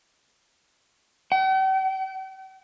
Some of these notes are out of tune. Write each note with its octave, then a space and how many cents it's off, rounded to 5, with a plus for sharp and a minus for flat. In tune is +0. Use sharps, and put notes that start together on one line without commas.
G5 -45